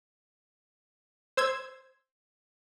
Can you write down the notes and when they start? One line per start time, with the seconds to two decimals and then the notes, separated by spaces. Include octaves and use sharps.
1.37 C5 E6 G#6